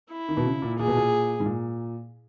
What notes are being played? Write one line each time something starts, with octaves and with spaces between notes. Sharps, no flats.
E4
D#3
B2
C#3
A#2
A#2 G#4
B2
A#2
G#2
A#2